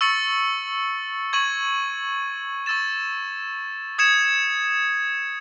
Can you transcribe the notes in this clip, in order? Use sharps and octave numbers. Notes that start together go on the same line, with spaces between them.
C#6 E6 A6 C#7 F#7
C#6 G#6 D#7 F#7
C#6 E6 A6 E7
D#6 G#6 C#7 E7